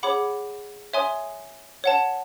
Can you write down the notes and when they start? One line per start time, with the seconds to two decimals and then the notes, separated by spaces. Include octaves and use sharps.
0.03 G#4 C#5 F#5 B5 D6
0.93 C#5 E5 G#5 C6 D#6
1.84 C#5 F#5 A5